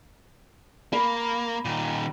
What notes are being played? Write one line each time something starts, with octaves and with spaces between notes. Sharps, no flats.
A#3 B5
A#2 D#3